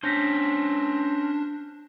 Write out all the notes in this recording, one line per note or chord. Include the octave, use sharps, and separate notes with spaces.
C#4 D4 C5 G6 A#6 B6